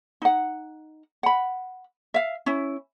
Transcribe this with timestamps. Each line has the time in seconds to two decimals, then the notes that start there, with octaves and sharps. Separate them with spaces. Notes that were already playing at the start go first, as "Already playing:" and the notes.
0.22 D#4 F#5
1.23 F#5 B5
2.14 E5 F5
2.46 C#4 E4